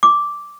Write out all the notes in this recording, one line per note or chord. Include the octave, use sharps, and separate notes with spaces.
D6